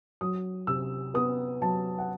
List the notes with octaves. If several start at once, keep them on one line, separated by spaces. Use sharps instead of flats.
F#3 D#6
C3 E6
B3 D#6
F#3 A5
F#5